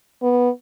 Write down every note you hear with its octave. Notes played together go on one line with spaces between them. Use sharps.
B3